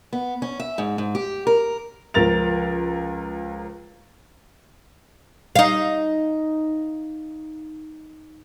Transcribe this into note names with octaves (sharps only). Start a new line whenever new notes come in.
B3
C#4
E5
G#2
G#2
G4
A#4
C#2 F3 A#4 A6 F7
D#4 F5